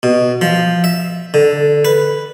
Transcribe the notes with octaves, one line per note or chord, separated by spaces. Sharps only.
B2
F3
E5
D3
B4